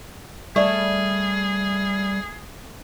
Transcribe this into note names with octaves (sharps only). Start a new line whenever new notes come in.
G3 A3 G#4 D5 C#6